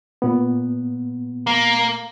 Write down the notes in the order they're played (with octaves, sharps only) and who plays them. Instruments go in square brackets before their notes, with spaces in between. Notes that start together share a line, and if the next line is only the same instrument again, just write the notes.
[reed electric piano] A#2 B3
[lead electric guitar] A#3